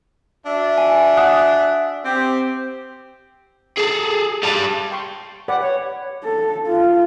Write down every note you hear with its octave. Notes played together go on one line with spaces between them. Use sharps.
D4 F#4 E5
G#5
F#5 D#6 F#6
C4 G4
G#4 A4
G3 A5
G5 C6 C#6
G4 B4 D5 F#5
C#5
A4
F4